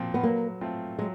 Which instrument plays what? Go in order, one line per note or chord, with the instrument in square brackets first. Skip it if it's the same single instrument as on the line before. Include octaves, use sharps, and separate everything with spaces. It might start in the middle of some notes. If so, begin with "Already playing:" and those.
Already playing: [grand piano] A#2 F3 C4
[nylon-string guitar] B3
[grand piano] F#3 [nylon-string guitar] A#3
[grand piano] A3 C4 F4
[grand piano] F#3 [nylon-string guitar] G#3